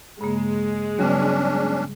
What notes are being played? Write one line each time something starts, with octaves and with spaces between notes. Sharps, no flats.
G2 C#3 G#3 A#3
C#3 F#3 G3 B3 C#4 D4 F#6